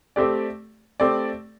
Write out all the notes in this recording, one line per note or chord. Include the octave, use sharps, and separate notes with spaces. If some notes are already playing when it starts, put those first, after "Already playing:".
A3 C4 G4 D5
A3 C4 G4 D5